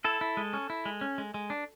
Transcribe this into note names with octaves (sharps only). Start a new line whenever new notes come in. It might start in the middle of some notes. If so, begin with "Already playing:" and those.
E4 A4
E4
G#3
C#4
E4
G#3
C#4
G#3
G#3
D4